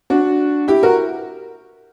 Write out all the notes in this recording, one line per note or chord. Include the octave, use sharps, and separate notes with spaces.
D4 F#4
E4 G4
F#4 A#4